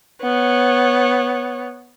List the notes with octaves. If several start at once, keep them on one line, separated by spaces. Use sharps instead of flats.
B3 C#5